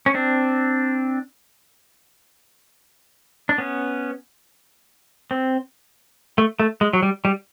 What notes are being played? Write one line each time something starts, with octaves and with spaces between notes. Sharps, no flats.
C#4
C4 D4
D4
B3 C#4
C4
A3
A3
G#3
F#3
G3
G3